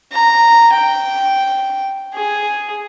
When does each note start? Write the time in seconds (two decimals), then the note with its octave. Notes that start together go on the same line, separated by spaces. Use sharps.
0.12 A#5
0.73 G5
2.14 G#4